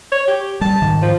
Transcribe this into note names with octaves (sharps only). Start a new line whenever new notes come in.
C#5
G4
G3 A5
G#2 D#3
F3